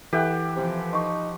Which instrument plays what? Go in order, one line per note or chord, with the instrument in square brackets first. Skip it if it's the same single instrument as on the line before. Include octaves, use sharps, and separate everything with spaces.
[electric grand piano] E3 A4 E5 [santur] G4 F#5 G5
[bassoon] C3 [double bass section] F3
[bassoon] D#4 [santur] C6 C#6